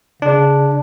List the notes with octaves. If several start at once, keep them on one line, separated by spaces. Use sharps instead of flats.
C#3 D4